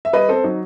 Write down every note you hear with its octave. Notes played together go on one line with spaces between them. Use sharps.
E5
G3 B4 D#5
C4 A4 C5
F#3 D#4